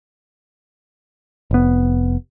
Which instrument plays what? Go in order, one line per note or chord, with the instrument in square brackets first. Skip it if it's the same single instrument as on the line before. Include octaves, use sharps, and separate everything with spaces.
[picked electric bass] F1 B3